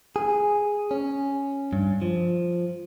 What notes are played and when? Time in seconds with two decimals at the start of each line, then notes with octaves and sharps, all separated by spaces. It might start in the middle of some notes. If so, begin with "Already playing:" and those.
0.16 G#4
0.91 C#4
1.73 G2
2.02 F3